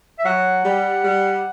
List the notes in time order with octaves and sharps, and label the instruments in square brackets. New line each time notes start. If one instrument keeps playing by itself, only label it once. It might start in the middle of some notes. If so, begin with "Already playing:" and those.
[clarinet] E5
[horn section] F#3 [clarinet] F#5
[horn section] G3
G3